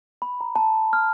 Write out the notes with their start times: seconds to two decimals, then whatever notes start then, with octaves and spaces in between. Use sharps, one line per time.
0.22 B5
0.41 A#5
0.56 A5
0.93 F6